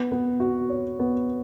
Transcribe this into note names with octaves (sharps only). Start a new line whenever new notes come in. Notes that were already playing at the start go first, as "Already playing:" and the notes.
Already playing: B3
B3
F#4
C#5
B3